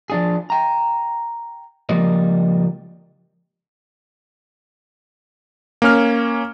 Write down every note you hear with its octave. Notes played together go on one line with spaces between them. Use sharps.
F3 D4 G#4
G5 A#5
C#2 F3 G3 A#3 D#5
A#3 C#4 F6